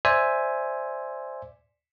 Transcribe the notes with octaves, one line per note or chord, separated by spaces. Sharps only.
C5 D5 E5 G#5